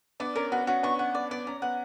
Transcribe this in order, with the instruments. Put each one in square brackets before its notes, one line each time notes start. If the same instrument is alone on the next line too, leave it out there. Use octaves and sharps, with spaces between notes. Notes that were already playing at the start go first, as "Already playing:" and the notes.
[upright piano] B3 D4 [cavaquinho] D5
[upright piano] C#4 [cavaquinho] A#4
[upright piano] B3 [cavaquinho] F#4
[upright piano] C#4 [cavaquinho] F#4
[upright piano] B3 D4 [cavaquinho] C#6
[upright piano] C#4 [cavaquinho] F#5
[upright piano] B3 [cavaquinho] D5
[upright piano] B3 [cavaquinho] D5
[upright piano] C#4 [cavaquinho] A#5
[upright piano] B3 [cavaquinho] F#5